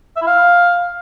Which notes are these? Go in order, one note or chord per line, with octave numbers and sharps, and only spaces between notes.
E5
E4
F5